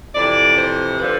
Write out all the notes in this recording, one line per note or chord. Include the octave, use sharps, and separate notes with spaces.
F2 C3 E3 D5
C5
D3 F3 B4